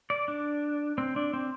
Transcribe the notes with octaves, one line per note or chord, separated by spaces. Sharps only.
D5
D4
C4
D4
C4